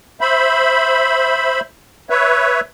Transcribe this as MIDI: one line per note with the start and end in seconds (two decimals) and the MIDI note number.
0.21 1.60 72
0.21 1.60 76
0.21 1.60 83
2.10 2.60 71
2.10 2.60 73
2.10 2.60 76